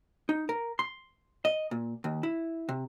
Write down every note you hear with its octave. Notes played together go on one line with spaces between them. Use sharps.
D#4
A#4
C6
D#5
A#2
D#2
E4
C3